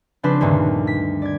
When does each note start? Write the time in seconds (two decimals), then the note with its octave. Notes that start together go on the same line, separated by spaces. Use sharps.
0.23 C#3 F3 C4 D4 B4 C6
0.41 D2 G2 A#2 D#3
0.87 B6
1.22 D5 G#6